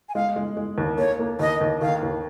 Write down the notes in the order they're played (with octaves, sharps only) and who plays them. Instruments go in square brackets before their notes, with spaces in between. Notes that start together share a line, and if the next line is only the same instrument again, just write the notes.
[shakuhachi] G#5
[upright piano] G#3 [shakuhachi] F5
[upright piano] G#3
G#3
D#2
[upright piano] A#3 [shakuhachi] C#5
[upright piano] A#3
[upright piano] D#2 [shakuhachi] D#5
[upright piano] D#2
[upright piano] D#3 [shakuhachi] F5
[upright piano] D#2